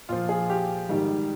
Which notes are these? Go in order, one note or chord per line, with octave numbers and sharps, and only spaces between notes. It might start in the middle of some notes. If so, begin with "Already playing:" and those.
A#2 F3 F4
G#4
G4
G#2 D#3 G3